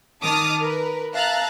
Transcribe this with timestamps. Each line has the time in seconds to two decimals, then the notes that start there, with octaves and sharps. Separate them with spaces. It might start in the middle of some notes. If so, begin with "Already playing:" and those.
0.23 D#3 A5 D6 D#6 F6
0.61 A#4 B4
1.14 E5 F5 A5 A#5 F#6 A6